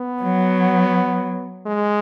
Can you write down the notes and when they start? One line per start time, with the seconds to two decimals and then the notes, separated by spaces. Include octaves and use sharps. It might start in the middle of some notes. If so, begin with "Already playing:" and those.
Already playing: B3
0.22 F#3
1.66 G#3